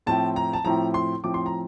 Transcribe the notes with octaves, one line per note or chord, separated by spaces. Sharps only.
A2 F3 C4 E4 A5
A#5
A5
A2 F3 C4 E4 A#5
C6
A2 F3 C4 E4 D6
C6
A#5